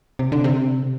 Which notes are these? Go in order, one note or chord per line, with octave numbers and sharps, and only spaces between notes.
C3
D3
C3